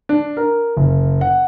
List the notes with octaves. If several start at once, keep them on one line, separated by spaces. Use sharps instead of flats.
D4
A#4
F#1
F#5